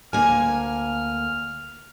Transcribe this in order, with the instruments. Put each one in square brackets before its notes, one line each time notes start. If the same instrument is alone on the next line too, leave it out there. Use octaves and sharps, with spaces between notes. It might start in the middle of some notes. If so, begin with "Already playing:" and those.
[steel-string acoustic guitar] D2 A#3 G#5 [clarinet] F6